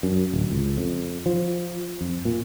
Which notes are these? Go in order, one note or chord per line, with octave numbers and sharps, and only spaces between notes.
F#2
D1
C#2
F2
F3
F2
A#2